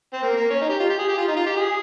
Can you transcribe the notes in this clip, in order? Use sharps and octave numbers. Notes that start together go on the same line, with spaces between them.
C4
A#3
A#3
C#4
D#4
G4
F4
G4
G#4
G4
F4
D#4
F4
G4
G#4